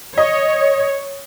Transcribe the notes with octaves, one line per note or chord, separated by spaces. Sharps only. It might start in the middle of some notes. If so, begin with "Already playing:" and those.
C#5 D#5